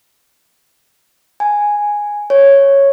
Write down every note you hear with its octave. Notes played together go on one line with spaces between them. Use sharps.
G#5
C#5